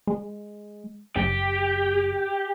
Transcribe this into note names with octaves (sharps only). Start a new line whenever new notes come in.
G#3
F#1 G4